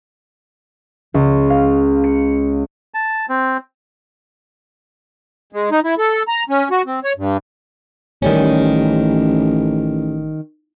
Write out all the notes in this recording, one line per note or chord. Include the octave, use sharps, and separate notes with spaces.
C#2
F5
C#7
A5
C4
G#3
D#4
E4
A4
A#5
C#4
F#4
C4
C#5
G2
A1 D#3 G3 C#4